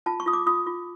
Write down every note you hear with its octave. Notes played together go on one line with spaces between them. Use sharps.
F4 A5
C#6
F4 D#6
D6
F4 D#6
F4